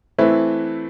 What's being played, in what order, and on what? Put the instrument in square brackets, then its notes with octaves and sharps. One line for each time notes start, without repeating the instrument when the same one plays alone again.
[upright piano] E3 A3 C4 E4 B4